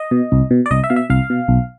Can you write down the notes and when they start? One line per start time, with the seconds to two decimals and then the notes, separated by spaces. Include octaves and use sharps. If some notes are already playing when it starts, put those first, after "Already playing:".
Already playing: D#5
0.11 B2
0.32 C2
0.51 B2
0.66 D5
0.71 C2 D#5
0.84 E5
0.90 B2 F5
0.96 E5
1.10 C2 F5
1.30 B2
1.48 B1